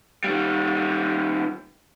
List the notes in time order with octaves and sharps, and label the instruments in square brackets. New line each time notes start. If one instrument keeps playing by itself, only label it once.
[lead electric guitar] D#3 G3